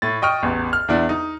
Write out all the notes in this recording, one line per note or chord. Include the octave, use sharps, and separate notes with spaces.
A2 A6
D#5 G5 C#6 F6
A1 E2
F6
E2 D4 E4
D#4